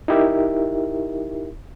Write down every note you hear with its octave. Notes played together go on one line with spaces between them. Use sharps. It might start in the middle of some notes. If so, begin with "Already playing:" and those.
D#4 E4 G4 A#4 E5